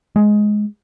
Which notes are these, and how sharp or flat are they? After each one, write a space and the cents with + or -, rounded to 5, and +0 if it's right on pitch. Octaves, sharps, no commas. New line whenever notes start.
G#3 +10